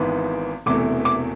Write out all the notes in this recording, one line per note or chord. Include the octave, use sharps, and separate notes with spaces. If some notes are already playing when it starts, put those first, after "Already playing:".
Already playing: G#1 G#2 E3 B3
E1 E2 C3 E3 A3 D6
D6